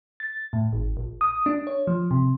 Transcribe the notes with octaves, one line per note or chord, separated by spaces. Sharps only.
A6
A2
G#1
A#1
D#6
D4
C#5
F3
C3